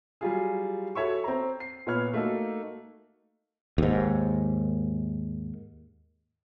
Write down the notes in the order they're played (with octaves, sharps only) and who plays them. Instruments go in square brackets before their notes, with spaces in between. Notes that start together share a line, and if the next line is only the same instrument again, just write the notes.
[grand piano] F#3 G3 F4 G#4
F#4 A4 C#5 E5 C#6
C4 A#5
C7
A#2 B3 C#5 F6
A3 A#3 D#4 F#4 A4
[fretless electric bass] D#2 G#2